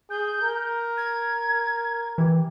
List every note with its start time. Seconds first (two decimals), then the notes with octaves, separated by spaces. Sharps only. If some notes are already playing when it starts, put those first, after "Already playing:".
0.10 G#4 G6
0.41 A#4
0.97 G#6
2.18 E3 G4